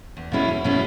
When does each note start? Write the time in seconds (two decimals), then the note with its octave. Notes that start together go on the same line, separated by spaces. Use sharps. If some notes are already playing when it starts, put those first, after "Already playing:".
0.17 E2
0.32 B2 G#3 C#4 E4
0.48 E2
0.64 B2 G#3 C#4 E4